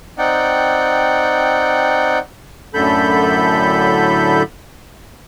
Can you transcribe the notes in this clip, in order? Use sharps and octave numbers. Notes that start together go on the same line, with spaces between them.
C4 D#4 D5 F#5 G5
F#2 A2 D3 A4 B5 G6